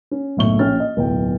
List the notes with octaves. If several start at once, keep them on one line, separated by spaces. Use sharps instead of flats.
C#4
F#1 B1 A2 C#6 G7
A#1 C#4 G5 F6 A6
D#5
D1 B1 G5